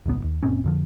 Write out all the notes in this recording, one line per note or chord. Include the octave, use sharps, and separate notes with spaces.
D#1 G#1 C#2 B3
D1 D#2
F#1 A#2 C4 C#4
F2 D3 F3